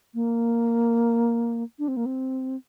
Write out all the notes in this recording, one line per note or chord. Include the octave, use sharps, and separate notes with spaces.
A#3
D4
C4
A#3
C4